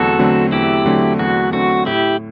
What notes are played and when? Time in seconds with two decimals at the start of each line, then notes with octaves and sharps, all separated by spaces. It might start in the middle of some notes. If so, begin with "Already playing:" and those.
Already playing: E2 D3 F#3 A3 C4 F#4 A4
0.19 D3 F#3 A3 C4
0.52 E2 E4 G4
0.86 D3 F#3 A3 C4
1.19 E2 F#4
1.52 D3 F#3 A3 C4 F#4
1.86 A2 E4 G4